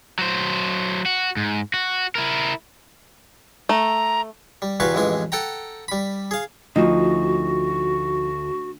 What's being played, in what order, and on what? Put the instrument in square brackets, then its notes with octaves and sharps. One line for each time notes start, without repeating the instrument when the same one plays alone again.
[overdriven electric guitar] F#3 C5
F#4
G#2
F#4
E4 A#4
[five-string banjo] A3 [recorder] A#5
[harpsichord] G3
E2 C3 F#4 B4 F5 G#5
A1 F2 E3 G#3 G#5
A4 F#5 G5 A#5
G3 B5
G#4 F5
[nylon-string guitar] D2 [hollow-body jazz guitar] F3 D#4 [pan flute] F#4